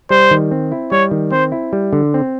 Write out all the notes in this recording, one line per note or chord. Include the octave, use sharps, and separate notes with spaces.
G3 C5
D#3
C4
E4
G3 C#5
D#3
C4 C5
E4
G3
D3
C4